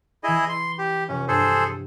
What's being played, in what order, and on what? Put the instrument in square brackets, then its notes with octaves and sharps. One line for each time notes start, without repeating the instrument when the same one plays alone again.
[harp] E3 B5 A6 [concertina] E4 G#4 D#5
[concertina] C6
G4
[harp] F1 C4 F#5 [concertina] C#4
[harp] G2 [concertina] G#4 A4 C5